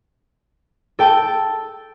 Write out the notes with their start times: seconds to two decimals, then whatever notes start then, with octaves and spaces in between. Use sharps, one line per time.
0.99 A4 G5 A5